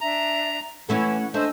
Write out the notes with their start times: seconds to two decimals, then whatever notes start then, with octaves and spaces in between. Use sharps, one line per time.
0.01 D4 E5 A#5
0.89 E3 A3 C#4 E4 A4 F#5
1.34 A3 D4 C5 D#5 E5 G#5 E6